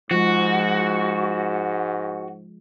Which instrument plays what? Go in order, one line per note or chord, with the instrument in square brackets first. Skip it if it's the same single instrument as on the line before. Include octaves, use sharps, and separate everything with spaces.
[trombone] G#2 [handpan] F3 G#3 [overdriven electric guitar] F#4